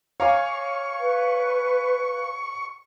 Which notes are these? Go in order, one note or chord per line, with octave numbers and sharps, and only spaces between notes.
C#5 F5 G#5 A#5 C#6 D6
B4